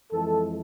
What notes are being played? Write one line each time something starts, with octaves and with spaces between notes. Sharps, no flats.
F2 E3 G#3 A4